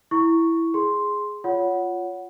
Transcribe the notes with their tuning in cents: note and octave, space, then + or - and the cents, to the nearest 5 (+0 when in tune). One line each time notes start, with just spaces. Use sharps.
E4 +0 C#6 +0
G#4 +0 C6 +0
F4 +0 C#5 +20 F#5 +0